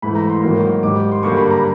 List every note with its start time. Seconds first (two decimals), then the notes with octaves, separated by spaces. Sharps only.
0.02 G#2 E3 A3 B5
0.15 A#5
0.29 C6
0.42 G#2 D#3 F#3 A#3
0.83 G#2 D#3 G3 D6
1.12 C6
1.23 G2 D3 G3 A#3 C#6
1.37 B5
1.51 A#5